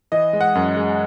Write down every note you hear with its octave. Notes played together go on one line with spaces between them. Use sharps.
E3 D#5
G#3
F#5
F#2
G#3